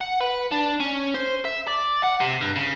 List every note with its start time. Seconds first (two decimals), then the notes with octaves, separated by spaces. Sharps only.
0.01 F#5
0.21 B4
0.52 D4
0.80 C#4
1.14 C5
1.45 E5
1.67 D5
2.03 F#5
2.20 C3
2.41 G2
2.56 C#3